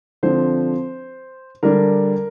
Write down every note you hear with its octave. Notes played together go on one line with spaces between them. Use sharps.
D3 F3 C4 C5
D3 G3 D4 A#4